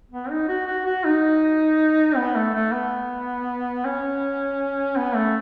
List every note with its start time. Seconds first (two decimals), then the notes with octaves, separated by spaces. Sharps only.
0.11 B3
0.31 D#4
0.49 F#4
0.67 F#4
0.86 F#4
1.05 D#4
2.16 B3
2.36 A3
2.54 A3
2.73 B3
3.85 C#4
4.96 B3
5.16 A3